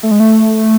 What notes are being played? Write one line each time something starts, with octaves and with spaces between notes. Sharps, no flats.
A3
G#3
A3